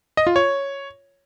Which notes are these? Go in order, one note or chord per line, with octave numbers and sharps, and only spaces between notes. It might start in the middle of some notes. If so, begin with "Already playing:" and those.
D#5
F4
C#5